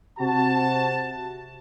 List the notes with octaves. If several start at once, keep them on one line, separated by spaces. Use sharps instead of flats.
C3 F#4 A5